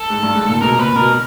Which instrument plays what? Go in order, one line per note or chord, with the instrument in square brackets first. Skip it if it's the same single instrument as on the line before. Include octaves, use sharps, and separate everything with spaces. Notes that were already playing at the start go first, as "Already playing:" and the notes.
Already playing: [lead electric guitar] A4
[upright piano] G#2
G2
G#2
A#2
[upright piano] B2 [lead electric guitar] A#4
[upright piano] A#2 [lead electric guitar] B4
[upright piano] B2 [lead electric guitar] A#4